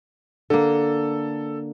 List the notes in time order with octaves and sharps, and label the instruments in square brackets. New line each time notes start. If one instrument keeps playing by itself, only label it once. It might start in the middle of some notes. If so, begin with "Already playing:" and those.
[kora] D3 A#3 [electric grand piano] A4